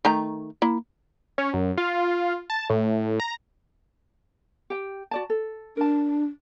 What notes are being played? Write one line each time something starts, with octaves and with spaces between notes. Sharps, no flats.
D#3 A3 A#5
A#3 E4
C#4
F#2
F4
A5
A2
A#5
G4 G5
F#4 D5 A5
A4
D4 A#4 A5